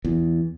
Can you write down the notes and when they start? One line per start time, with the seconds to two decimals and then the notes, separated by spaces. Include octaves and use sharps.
0.05 E2